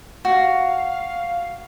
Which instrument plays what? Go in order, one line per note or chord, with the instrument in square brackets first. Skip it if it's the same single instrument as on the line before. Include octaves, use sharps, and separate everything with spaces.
[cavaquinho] F#4 [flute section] F5